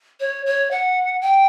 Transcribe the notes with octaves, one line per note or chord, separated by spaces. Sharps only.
C#5
C#5
F#5
G5